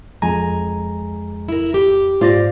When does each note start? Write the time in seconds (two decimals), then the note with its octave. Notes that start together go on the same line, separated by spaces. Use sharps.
0.22 F2 G#3 G#5 A#5
1.49 E4 A#4
1.74 G4
2.21 G#2 F4 C5 D5 A#6